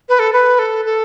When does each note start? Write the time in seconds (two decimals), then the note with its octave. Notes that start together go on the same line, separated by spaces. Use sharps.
0.09 B4
0.19 A4
0.33 B4
0.59 A4
0.85 A4